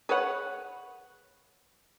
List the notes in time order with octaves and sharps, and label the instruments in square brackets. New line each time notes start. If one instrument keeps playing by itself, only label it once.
[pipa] G#4 B4 C#5 F#5